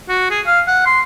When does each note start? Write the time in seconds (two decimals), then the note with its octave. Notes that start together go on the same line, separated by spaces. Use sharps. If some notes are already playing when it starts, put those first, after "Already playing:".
0.09 F#4
0.30 G#4
0.46 F5
0.67 F#5
0.86 C6